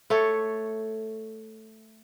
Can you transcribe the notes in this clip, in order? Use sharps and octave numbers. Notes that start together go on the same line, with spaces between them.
A3 A4 C#5